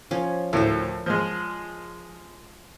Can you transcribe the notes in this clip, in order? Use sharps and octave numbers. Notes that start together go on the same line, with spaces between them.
F3 C#4
D2 A2 A#4 C5
F3 G#3